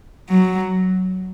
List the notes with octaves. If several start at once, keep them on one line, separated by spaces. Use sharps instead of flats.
F#3